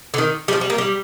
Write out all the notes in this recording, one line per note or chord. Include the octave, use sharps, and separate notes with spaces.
D3
D#3
G3
F3
G3
A#3
G3